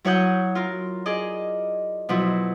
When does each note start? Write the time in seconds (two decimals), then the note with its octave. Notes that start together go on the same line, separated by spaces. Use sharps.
0.05 F#3 E4 C#5 F#5 D#6 G6
0.55 F4 A#4
1.06 G#4 D5 D#5
2.09 B2 F3 F#3 E4